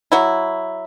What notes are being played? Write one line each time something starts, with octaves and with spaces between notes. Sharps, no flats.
F#3 E4